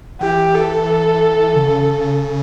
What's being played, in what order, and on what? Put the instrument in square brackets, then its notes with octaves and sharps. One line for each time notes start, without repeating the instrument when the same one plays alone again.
[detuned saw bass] E3 [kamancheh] G4
[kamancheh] A4
[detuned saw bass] C#3